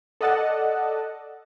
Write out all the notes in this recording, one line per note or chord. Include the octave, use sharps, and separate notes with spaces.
A4 D5 D#5 F#5 A5